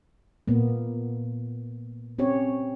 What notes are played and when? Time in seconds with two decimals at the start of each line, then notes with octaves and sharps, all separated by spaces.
0.47 A#2 A#3 B3
2.18 C4 C#4 G4 C#5